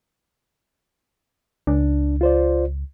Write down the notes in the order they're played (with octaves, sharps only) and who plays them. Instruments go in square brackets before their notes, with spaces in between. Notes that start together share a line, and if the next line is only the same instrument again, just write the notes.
[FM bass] C#2 [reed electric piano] D4
[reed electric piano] F4 C5 D5